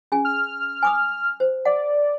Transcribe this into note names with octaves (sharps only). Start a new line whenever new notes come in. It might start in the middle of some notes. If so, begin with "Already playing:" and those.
C#4 G#4 G#5
F6
G#5 D6 D#6
C5
D5 F#5